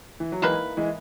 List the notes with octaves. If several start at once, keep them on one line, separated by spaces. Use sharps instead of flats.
E3
F#3
D#3 E3 G#3 A#3 E4 B4
E3 G#3